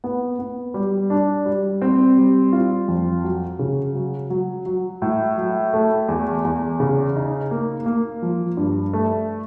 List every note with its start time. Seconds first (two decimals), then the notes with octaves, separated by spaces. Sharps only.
0.04 B3
0.39 B3
0.74 G3
1.10 D4
1.46 G3
1.82 C4
2.17 G3
2.52 F4
2.88 F2
3.24 F#3
3.59 C#3
3.95 F#3
4.30 F#3
4.66 F#3
5.02 A2
5.37 F#3
5.73 A3
6.08 E2
6.45 E2
6.80 C#3
7.16 D#4
7.51 A#3
7.86 A#3
8.22 F3
8.57 G2
8.93 A3